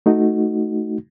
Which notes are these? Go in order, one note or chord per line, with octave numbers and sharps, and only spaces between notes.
A3 D#4 F#4